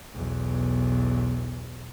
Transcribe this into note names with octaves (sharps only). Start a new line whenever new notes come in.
B1 E2